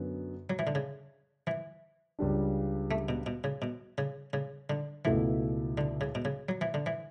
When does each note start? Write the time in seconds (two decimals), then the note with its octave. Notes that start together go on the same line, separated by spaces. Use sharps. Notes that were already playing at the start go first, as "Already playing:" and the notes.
Already playing: F#2 D3 F#3 B3
0.50 F#3
0.59 E3
0.67 D3
0.75 C#3
1.47 E3
2.19 C#2 C#3 G3 D4
2.91 A3
3.09 B2
3.26 B2
3.44 C#3
3.62 B2
3.98 C#3
4.33 C#3
4.70 D3
5.05 C#2 B2 E3 A3 E4
5.78 D3
6.01 C#3
6.15 B2
6.25 C#3
6.49 F#3
6.61 E3
6.74 D3
6.86 E3